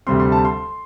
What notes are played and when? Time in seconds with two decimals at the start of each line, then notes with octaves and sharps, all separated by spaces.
0.07 D2 C3 G3 C4 C6
0.20 C6
0.32 A5
0.45 C6